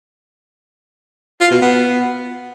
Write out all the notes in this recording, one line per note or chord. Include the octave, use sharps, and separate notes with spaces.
F4
B2
B3